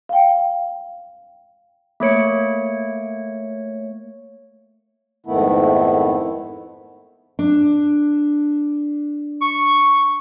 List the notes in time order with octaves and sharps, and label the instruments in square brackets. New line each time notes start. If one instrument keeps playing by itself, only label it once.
[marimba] F5 G5
[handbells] A3 A#3 C#5 C#7
[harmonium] F2 G#2 D#3 A3 B3 E4
[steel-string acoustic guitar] D4
[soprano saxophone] C#6